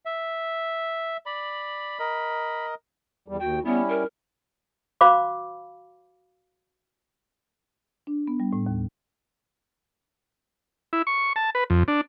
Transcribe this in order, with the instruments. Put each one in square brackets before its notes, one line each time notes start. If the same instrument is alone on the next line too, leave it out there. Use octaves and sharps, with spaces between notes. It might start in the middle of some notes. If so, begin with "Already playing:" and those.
[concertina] E5
[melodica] D5 [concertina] B5
[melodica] A#4 D#5
[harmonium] E2 G3
[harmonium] D#2 G5 [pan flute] F#4
[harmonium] G3 C#4 E4 [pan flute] B3
[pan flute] A#4
[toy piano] F#4 C5 F5 B5 D6
[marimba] D4
B3
G3
A2
D#2
[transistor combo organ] E4
C#6
A5
B4
F2
D4